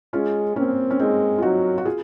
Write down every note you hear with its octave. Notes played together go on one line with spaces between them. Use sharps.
G#3 C#4 F4
A#3 C4 C#4
C#4
G#3 C4 D#4
F4
F#3 D#4 F#4
F#4
F4 G#4